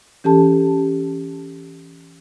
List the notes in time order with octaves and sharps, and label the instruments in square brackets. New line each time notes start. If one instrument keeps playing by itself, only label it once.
[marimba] E3 C#4 G4 A4 A5